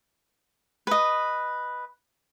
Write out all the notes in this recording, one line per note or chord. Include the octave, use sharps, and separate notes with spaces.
B4 D#5